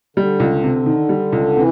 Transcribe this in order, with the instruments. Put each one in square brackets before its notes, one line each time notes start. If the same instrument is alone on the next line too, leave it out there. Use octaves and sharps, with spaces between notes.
[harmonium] D3 [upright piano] G3
[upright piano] C#2
C3
D#3
G3
C#2
[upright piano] C3 [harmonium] E3